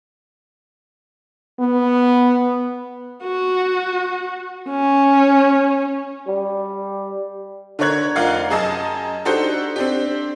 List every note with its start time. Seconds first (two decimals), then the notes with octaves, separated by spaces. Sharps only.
1.60 B3
3.23 F#4
4.69 C#4
6.27 G3
7.79 D3 D4 A#4 C#5 F#6 G#6
8.16 F1 F4 A#4 D5 F5 F#5
8.50 F#2 G#4 D#5 A5 D#6
9.25 D4 D#4 F#4 G4 A4 C5
9.76 C4 D4 G4